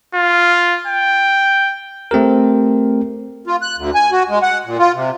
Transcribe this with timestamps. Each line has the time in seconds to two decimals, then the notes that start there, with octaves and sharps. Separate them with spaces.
0.15 F4
0.87 G5
2.11 A3 C4 G4 A#4
3.47 F4
3.62 F#6
3.78 D2
3.95 G#5
4.12 F#4
4.29 G#3
4.42 F#5
4.66 A#2
4.79 F4
4.95 C3